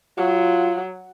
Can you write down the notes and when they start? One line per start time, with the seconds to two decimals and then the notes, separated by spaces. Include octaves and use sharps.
0.18 F#3 F4